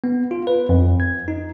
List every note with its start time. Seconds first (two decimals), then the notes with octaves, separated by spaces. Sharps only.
0.04 B3
0.31 F4
0.47 B4
0.69 F2
1.00 G#6
1.28 D#4